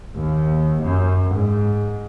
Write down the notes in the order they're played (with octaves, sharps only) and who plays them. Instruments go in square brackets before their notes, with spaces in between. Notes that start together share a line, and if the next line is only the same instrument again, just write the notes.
[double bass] D#2
F#2
G#2